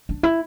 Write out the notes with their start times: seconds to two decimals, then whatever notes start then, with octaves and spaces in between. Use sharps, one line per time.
0.09 D4
0.23 E4